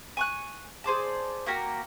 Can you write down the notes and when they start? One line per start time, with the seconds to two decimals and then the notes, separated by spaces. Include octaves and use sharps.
0.17 G#5 C#6 F#6
0.84 G#4 C5 D5 A5
1.46 A#3 F#4 G4 A#4